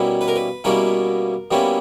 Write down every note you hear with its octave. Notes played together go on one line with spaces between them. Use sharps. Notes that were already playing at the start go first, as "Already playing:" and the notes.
Already playing: B2 G3 A#3 C#4 E4
B4
A#4
B4
B2 G3 A#3 C#4 E4 A#4
B2 G3 A#3 C#4 E4